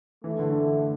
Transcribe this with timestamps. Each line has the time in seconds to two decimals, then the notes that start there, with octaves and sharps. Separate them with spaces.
0.24 E3 A3
0.39 D3